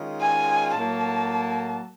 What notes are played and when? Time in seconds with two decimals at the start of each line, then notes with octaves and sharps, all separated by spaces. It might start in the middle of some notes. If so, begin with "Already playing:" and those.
Already playing: D#3 G#3 C#4 F4
0.21 G#5
0.75 A2 F#3 A#3 A5